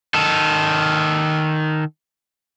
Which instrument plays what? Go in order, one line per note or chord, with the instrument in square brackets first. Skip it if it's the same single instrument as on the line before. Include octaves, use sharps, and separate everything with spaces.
[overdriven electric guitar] D#3 A4